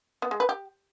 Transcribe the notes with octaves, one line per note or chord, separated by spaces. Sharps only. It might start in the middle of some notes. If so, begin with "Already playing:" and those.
B3
G#3
B4
G4